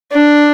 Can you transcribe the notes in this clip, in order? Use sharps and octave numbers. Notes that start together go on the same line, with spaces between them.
D4